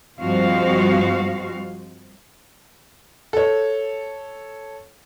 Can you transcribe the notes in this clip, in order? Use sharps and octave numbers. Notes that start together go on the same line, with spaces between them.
G2 F3 G#3 C4 F#4 F5
A4 C#5